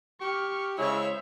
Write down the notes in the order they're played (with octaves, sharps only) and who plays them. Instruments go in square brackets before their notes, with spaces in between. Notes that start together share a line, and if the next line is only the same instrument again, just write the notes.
[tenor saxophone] G4 [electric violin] C#6 F6
[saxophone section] C#3 G#3 [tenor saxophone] E4 [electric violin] C5 E5 [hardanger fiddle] C#5 C#6